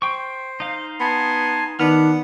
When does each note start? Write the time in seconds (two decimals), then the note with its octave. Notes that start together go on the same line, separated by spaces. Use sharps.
0.02 C5 G5 C#6
0.60 D#4 F5
1.00 B3 G#5 A5 C6
1.79 D#3 B3 D4 F6